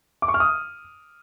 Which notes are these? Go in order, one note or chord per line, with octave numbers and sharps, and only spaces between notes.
D6
C#6
F6
D#6